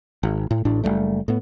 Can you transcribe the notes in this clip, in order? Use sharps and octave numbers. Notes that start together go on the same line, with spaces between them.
G#1
A2
A1 A2 D4
F#1 E2 G3 A3
A2 B3